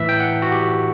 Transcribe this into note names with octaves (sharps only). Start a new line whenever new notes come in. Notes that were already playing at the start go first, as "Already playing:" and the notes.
Already playing: A2 E3 E5
G5
F#5
F#4
G4